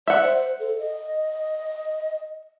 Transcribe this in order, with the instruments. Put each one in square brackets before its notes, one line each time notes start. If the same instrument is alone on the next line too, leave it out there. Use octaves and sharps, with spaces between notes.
[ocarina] D5 [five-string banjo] E5 F#5
[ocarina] C5
A4
D#5